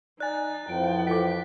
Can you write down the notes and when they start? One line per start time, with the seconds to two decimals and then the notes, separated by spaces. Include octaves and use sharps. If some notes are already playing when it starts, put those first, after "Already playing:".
0.20 D#4 D5 G#5 F#6 A6
0.69 F2 E3 F3 G5 D7
1.07 F4 A4 D6 B6